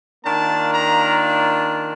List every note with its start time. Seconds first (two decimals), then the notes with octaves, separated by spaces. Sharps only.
0.24 D#3 A#3 D4 F4 A5
0.71 A#5